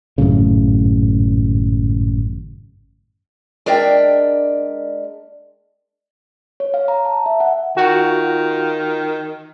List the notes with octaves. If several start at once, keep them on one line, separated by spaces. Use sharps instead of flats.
G#1 F#2 A2 C#3
G#3 D4 A#4 D5 E5 G5
C#5
F5
A#5
A5
E5
F#5
D#3 F4 F#4